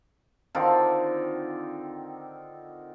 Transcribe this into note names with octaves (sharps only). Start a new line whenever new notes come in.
D3 D#3 C4 F4